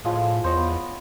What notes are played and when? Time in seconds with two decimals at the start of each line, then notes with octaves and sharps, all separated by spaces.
0.05 A2 F3 G#3 G#5
0.44 E2 C5 C#5 D#5
0.56 B3